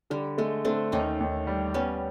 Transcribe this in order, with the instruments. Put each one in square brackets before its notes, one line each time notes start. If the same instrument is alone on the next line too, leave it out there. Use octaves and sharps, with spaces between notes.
[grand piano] D3 [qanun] G3
[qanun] G#3 [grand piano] A3
[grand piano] A3 [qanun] C4 D4
[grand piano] D#2 [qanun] C#4 D#4
[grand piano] D#2
G3
[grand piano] G3 [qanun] B3 C#4